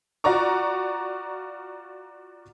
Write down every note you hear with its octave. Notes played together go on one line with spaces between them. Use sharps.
F4 F#4 D5 A#5 C#6